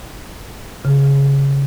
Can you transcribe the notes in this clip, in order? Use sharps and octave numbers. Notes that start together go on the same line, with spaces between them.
C#3